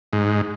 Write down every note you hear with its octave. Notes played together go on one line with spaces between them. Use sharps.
G#2